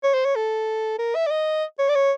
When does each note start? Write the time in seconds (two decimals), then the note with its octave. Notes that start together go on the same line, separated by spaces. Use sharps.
0.03 C#5
0.14 C5
0.25 C#5
0.35 A4
0.99 A#4
1.15 E5
1.26 D5
1.31 D#5
1.79 C#5
1.89 D5
1.95 C#5